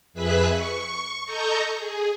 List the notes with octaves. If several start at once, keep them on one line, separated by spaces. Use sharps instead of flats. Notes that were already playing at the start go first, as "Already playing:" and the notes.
F2 G#4 B4 E5 F#6 B6
C#6
A4 D#5 A#5 C#6 G6
G#4